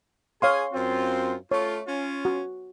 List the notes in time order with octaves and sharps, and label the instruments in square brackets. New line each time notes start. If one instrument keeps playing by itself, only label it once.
[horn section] G#4 G#5 [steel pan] C#5 F5 C6
[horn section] F#2 C4 F4
[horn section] A3 F4 [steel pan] C#5
[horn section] C#4 F4
[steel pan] F#4